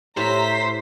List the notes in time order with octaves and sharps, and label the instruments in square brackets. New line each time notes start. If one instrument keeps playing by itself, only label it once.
[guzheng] A2 [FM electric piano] G4 C#5 [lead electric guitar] C5 [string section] A#5 B6